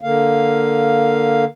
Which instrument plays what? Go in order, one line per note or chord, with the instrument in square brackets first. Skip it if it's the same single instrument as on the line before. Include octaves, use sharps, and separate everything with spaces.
[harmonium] D3 A#3 F5